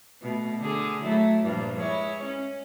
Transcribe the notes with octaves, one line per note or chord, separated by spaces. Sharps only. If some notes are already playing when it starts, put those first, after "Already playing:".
B2 A3
D3 G#4
F#3 A3 E4
G2 A#2 F3
G#3 E4 C#5
C#4